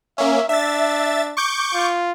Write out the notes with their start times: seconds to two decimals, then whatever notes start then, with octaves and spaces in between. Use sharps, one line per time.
0.18 A#3 C#4 E5
0.49 D4 E5 A6
1.37 C#6 D6 G6
1.74 F4